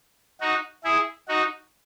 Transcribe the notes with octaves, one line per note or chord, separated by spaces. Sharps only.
D#4 F#4
E4 G#4
D#4 F#4